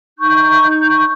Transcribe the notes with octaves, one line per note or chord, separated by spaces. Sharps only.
D#4 C#6 G6